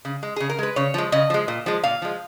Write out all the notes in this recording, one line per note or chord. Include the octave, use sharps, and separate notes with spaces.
C#3
G#3
C#3 G#4
A#4
G#3 B4
C#3 C#5
F3 G#3
C#3 D#5
F3 G#3
A#2
F3 G#3
A#2 F5
F3 G#3